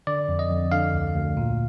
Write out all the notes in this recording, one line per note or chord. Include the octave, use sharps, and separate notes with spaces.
D3 D5
F2
D#5
F2
D3 F5
D2
D2
A#2